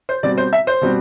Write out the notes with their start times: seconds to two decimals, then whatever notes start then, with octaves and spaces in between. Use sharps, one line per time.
0.09 C5
0.23 B2 G3 C4 D5
0.38 C5
0.53 E5
0.67 C5
0.81 B2 G3 C4